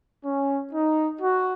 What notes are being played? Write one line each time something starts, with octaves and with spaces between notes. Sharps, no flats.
C#4
D#4
F#4